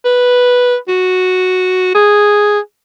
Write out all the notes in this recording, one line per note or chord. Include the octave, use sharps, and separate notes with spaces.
B4
F#4
G#4